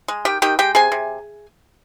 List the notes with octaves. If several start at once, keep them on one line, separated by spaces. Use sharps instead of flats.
G#3
D#3 G4 G5
D#3 G4 G5
G#3 G4 G5
C3 G#4 G#5
C3